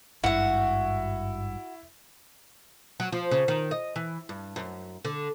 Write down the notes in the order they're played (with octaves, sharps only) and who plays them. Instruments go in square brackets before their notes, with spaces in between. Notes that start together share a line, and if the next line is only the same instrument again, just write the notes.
[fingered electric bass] G#1 G2 [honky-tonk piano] E4 [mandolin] F#4 F#5
[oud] F#3
F3
C#3
D#3
D#5
E3
G2
F#2
D3